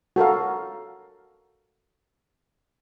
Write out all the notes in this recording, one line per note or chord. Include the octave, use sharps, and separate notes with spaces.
F#4 A4 A#4 F5